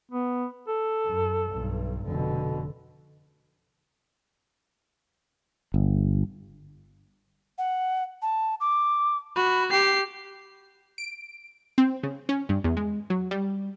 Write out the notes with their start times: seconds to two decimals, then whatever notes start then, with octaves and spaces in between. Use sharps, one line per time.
0.11 B3
0.68 A4
1.06 F#2
1.51 B1 G2
2.05 F1 B2 D3
5.74 G1
7.58 F#5
8.22 A5
8.61 D6
9.36 F#4 B5
9.70 G4 G5 C7
10.98 D7
11.78 C4
12.03 C#3
12.29 C#4
12.49 G2
12.64 E2
12.77 G#3
13.10 F#3
13.31 G3